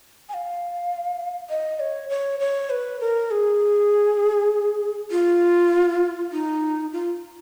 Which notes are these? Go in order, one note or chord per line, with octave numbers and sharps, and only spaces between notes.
G#5
F5
D#5
C#5
C#5
C#5
B4
A#4
G#4
F4
D#4
F4